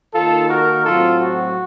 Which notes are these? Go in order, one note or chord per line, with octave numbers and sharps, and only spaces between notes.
D#3 A#3 D#4 F4 A4
F#4 A#4
A2 F#3 C4 F4 A4
F#4